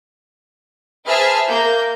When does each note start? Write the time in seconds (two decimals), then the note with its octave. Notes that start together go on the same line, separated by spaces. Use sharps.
1.06 G#4 B4 C5 E5 A5 F6
1.49 A#3 G6